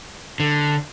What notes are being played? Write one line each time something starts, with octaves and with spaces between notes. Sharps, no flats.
D3